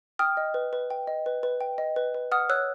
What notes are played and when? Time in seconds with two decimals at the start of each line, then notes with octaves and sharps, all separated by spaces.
0.19 G5 D#6 F6
0.37 D#5
0.54 B4
0.73 B4
0.90 G5
1.07 D#5
1.26 B4
1.43 B4
1.61 G5
1.78 D#5
1.96 B4
2.14 B4
2.32 F#5 D#6 F6
2.49 C#5 E6 F#6